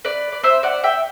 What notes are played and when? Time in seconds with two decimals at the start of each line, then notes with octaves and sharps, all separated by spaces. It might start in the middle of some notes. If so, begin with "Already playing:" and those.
0.05 B4 D5
0.32 D5
0.43 C5 E5
0.63 D5 F#5
0.84 E5 G5